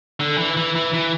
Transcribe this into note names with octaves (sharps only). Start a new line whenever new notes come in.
D3
E3
E3
E3
E3